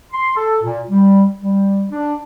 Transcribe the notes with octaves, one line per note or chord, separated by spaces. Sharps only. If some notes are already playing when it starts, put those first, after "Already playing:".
C6
A4
A#2
G3
G3
D4